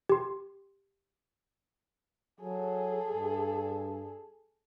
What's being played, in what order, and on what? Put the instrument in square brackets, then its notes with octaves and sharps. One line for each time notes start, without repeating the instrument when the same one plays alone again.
[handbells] G4 C6
[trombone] F#3 [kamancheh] G#4 A4
[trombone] G2